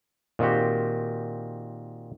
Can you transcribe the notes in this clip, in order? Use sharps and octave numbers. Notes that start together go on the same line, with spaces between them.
A#2 D#3 C4 F#4 G4